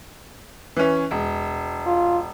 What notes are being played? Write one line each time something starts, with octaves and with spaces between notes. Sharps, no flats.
E3 C#4
E1
F4